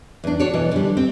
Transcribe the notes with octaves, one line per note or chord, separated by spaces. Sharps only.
E2 D4
F#4 A4 C#5 D5
B2 E3
D3 G3
C4